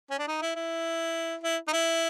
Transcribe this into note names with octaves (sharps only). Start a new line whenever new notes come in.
C#4
D4
D#4
E4
E4
E4
D#4
E4